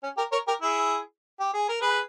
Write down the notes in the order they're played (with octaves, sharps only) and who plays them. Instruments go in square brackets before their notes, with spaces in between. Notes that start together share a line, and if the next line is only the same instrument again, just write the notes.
[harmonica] C#4
G4 A#4
A#4 C#5
G4 A#4
E4 G#4
G4
G#4
A#4
G#4 B4